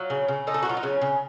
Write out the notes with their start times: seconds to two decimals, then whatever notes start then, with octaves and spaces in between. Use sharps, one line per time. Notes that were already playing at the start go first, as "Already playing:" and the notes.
Already playing: F#3 F4
0.10 C#3
0.28 C#3
0.47 A3 D#4
0.54 A4
0.63 F#4
0.65 F#3 F4
0.77 D#4
0.83 C#3 C#4
1.02 C#3